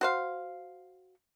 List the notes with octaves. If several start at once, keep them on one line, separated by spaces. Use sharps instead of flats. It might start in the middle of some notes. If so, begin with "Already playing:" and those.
F#4 C5 F5